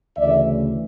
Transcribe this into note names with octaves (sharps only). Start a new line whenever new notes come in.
D2 C#3 E3 A3 D5 E5